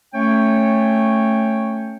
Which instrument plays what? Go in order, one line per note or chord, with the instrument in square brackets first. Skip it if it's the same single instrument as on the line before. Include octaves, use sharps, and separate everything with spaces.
[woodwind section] A3 C#4 C#5 G5